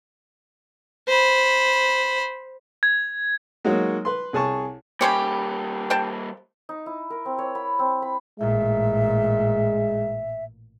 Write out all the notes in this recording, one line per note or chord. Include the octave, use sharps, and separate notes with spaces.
C5 B5
G#6
F#3 G#3 A#3 D#4 F#4 C#5
B4 C6
C2 G#4 C#5 A5 C#6
G3 A#3 C#4 G4 C5 C#5 B5
C5 G5 A5
D#4
E4
A#4
C4
C#5
B5
C4
B5
A1 A#2 G#3 E5